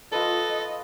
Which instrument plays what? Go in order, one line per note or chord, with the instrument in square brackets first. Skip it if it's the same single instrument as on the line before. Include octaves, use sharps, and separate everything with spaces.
[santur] F4 B4 [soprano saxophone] A4 [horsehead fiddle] D#5